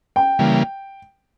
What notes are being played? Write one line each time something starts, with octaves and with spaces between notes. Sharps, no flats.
G5
C#3 E3 G3 A#3